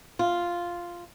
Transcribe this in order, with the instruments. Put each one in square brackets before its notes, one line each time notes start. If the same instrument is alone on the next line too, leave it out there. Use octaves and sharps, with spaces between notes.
[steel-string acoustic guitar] F4